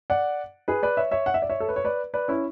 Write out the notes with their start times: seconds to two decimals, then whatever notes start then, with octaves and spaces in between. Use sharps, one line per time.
0.10 D5 F#5
0.68 G#4 B4
0.83 B4 D5
0.97 C#5 E5
1.11 C#5 E5
1.26 F#5
1.34 E5
1.42 D5
1.49 C#5 E5
1.60 A4
1.69 B4
1.76 C#5
1.85 B4 D5
2.14 B4 D5
2.28 C#4 E4